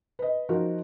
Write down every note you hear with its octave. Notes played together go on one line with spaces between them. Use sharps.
B4 D#5
F3 D#4 F#4 A#4